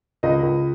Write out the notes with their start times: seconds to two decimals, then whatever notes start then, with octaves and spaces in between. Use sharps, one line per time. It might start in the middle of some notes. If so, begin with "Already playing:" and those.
0.23 C#2 D#5
0.43 C#2